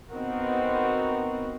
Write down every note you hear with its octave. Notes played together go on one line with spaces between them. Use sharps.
B3 C4 D#4 F#4 A#4